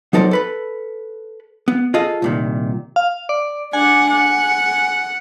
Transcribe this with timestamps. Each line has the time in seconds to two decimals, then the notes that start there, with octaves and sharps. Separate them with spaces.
0.13 F#3 D#4 A4 A#4 C5 D5
0.31 A4 B4 B5
1.68 B3
1.94 F4 G#4 A4 D#5 F5
2.22 C2 A#2 D#3
2.96 F5
3.29 D5
3.73 D4 F#5 G#5
4.11 F#5